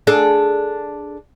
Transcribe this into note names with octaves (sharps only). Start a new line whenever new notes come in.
D4 G#4 A4